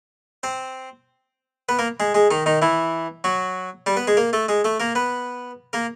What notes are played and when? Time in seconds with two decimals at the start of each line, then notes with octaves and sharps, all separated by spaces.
0.43 C4 C5
1.69 B3 B4
1.79 A#3 A#4
2.00 G#3 G#4
2.15 G#3 G#4
2.31 D#3 D#4
2.46 D#3 D#4
2.62 E3 E4
3.24 F#3 F#4
3.86 G3 G4
3.97 B3 B4
4.07 G#3 G#4
4.17 A#3 A#4
4.33 A3 A4
4.49 G#3 G#4
4.64 A3 A4
4.80 A#3 A#4
4.95 B3 B4
5.73 A#3 A#4